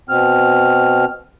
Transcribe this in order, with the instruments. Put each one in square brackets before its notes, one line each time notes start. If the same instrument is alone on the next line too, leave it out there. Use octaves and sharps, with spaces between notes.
[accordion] B2 C4 F6